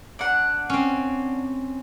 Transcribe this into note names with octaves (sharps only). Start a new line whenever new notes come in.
D4 F#5
C4 C#4